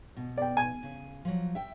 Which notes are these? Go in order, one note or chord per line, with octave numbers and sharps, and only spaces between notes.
B2
D5 G5
G#5
C#3
F3 F#3
E5 G5